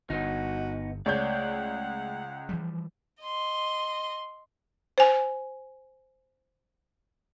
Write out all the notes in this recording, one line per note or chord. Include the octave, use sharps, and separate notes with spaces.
G1 G2 B3 D#4 F#4
C#2 A3 C#5 D5 F#5 G6
E3 F3 G3
D#5 C6
C5 G#5